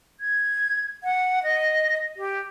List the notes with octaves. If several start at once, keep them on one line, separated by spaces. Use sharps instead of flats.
G#6
F#5
D#5
G4